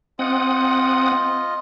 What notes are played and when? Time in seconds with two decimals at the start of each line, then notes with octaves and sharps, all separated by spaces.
0.19 C4 F4 D#5 F#5 D#6